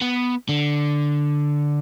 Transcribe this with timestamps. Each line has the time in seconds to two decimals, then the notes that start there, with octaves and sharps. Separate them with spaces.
0.02 B3
0.49 D3